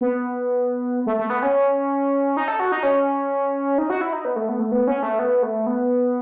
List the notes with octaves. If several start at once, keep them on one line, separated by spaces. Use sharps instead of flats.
B3
A3
A3
B3
C#4
D#4
A4
F#4
D#4
C#4
D#4
F#4
E4
D#4
B3
A3
B3
A3
B3
C#4
A3
B3
A3
B3